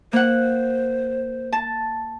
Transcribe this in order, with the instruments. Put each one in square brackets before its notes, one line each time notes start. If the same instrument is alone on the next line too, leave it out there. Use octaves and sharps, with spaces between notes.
[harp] A#3 F#5 [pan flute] C5
[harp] A5